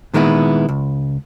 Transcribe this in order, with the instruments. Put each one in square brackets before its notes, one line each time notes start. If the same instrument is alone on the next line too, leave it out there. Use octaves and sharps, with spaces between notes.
[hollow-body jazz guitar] A#2 D#3 G#3 B3 E4
C#2